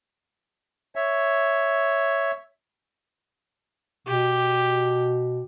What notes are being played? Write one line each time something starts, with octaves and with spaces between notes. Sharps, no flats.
C#5 E5
B2 G4